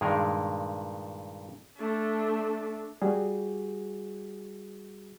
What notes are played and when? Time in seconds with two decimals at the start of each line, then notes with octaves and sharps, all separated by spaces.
0.01 G2 A#2 D#3 G#3 G#4 A#4
1.78 A3 D4
3.02 G3 F#4 G#4